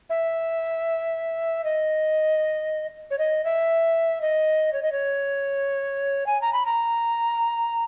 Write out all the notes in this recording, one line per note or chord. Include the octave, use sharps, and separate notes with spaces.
E5
D#5
C#5
D#5
E5
D#5
C#5
D#5
C#5
G#5
A#5
B5
A#5